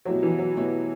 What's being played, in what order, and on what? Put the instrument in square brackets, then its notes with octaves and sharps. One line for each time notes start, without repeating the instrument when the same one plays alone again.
[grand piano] B2 A3 E4 G4 C#5 [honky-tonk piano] F#3
[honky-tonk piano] E3
F#3
[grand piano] B2 A3 E4 G4 C#5